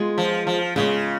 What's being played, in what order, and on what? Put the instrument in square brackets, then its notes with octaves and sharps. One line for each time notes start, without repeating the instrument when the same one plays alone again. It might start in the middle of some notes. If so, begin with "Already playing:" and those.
Already playing: [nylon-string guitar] G#3 B3 F4 G#4
[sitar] F3
F3
[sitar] C#3 [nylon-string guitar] G#3 B3 F4 G#4